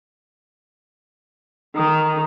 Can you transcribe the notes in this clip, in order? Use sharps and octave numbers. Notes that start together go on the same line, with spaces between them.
D#3